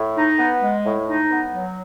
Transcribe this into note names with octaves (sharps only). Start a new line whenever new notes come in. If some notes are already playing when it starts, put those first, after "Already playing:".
Already playing: A2
D#4
B3
G#3
A2
D#4
B3
F#3